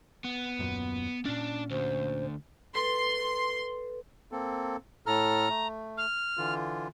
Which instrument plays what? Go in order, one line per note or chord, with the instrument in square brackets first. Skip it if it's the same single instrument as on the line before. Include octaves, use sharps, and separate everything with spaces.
[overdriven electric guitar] B3
[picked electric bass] D#1 F#2 A#2
[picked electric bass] A#2 C#4 [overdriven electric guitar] D4 D5
[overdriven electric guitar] D2 [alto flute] C5
[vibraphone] A4 B4 [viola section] C6
[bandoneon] A#3 C4 A4
[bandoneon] A2 A4 F6 [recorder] A#5
[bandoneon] A3
[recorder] F6
[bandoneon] D3 E3 F4